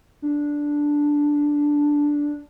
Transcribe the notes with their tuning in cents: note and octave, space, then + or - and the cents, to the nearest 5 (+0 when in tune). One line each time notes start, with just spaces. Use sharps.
D4 -5